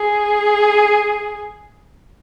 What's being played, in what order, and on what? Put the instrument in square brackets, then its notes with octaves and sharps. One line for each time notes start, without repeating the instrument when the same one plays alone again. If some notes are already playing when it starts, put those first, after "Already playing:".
Already playing: [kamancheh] G#4